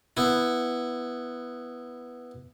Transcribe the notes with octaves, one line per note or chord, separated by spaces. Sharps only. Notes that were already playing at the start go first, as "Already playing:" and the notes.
B3 E4